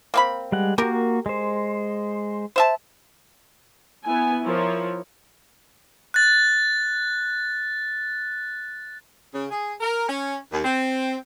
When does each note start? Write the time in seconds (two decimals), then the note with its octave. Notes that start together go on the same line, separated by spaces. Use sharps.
0.14 A#3 C4 B5
0.52 G3 G#3 F#5
0.78 A#3 F#4 G4 A#4
1.26 G#3 C5
2.56 C5 E5 A5
4.05 B3 E4 G#5
4.44 F3 E4 A#4 C#5
6.14 F#6 A6
9.34 C#3
9.51 G#4
9.80 A#4
10.09 C#4
10.52 D#2
10.64 C4